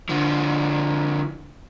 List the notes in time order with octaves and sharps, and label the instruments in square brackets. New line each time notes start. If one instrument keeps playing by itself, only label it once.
[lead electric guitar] D3 F3